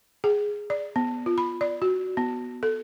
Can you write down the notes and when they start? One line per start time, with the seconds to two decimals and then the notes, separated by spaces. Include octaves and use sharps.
0.24 G#4
0.70 D5
0.96 B3
1.26 F4
1.38 B5
1.61 D5
1.82 F#4
2.17 B3
2.63 A4